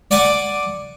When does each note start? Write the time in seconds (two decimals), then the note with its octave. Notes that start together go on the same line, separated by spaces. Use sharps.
0.11 D5 F#5 G#5 D6